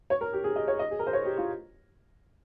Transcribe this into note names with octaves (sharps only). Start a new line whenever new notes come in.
C#5
A#4
G4
G#4
D#5
C#5
D#5
G#4
A#4
C5
C#5
G4
F4